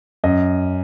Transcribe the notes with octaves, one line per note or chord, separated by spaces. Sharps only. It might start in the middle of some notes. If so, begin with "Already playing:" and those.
F#2 D#5